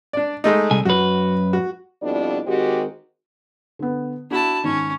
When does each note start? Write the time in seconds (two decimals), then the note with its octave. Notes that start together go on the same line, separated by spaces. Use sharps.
0.13 D4 D5
0.44 G#3 A3 D#4
0.71 C2 G#5
0.85 F#2 F#4 B4
1.53 F#4
2.02 F2 B2 G3 D4 E4 D5
2.47 D#3 G#3 C4 F#4 G4
3.79 D3 B3
4.31 D4 E4 F#4 A5
4.64 G#2 D#3 C#4